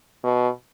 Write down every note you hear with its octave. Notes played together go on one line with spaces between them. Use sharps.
B2